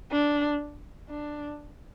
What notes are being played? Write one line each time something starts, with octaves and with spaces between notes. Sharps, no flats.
D4
D4